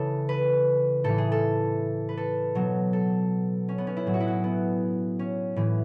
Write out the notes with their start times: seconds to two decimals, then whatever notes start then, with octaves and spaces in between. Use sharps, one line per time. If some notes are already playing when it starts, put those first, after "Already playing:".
Already playing: C#3 E3 A4
0.29 B4
1.04 A2 E3 A4
1.18 G#4
1.32 A4
2.09 B4
2.17 A4
2.55 B2 F#3
2.93 A4
3.69 C#4
3.78 B3
3.87 C#4
3.97 E4
4.06 A2 F#3 G#4
4.14 F#4
4.20 E4
4.28 F#4
4.44 B3
5.19 C#4
5.56 A2 E3